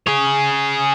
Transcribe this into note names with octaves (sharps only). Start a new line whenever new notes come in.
G#4 C#5